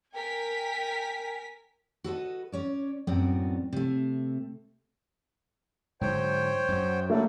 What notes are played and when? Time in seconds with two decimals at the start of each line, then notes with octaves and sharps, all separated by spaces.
0.13 A#4 G5 G#5 B6
2.04 F#4 A4 B4 D#5
2.52 C#4 C#5 D5
3.07 F#2 A2 B3 C4 F#4 D5
3.73 C3 A3
6.01 G#2 D3 F#3 C5 C#5 G5
6.68 F#2 F#3
7.10 F#3 G3 A3 A#3